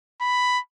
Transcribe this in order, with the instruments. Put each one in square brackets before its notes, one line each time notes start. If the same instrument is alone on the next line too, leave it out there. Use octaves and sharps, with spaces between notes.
[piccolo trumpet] B5